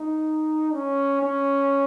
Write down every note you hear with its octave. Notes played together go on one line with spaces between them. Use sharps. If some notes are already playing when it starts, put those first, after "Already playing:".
Already playing: D#4
C#4
C#4